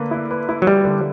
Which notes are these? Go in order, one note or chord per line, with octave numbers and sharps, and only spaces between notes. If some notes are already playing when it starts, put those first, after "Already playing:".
Already playing: D3 A#3 B4
E4
B4
E4
F#3
G3 E4
D3